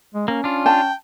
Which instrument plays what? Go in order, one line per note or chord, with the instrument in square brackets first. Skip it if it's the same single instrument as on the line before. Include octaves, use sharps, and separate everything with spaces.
[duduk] G#3
[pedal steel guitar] A#3 [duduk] C#4
[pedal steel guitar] D4 F4
[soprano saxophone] G5 [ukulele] A5